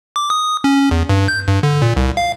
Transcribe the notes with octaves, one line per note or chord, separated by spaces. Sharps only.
D6
D#6
C#4
E2
G2
G6
G2
D3
A#2
C2
F5